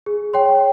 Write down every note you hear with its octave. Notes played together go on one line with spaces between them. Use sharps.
G#4
C#5 G5 C6